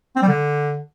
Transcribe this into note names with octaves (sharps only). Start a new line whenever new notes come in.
C4
G3
D3